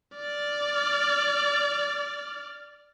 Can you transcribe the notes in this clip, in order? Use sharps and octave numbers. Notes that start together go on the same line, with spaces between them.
D5 F6